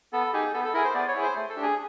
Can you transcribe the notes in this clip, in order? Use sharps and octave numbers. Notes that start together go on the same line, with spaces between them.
B3 A4
D#4 G4 G#4
B3 A4
A4
E4 G#4 A#4
C5
B3 D5
C#5
E4 G#4
C5
A3
A4
D4 G4
G#4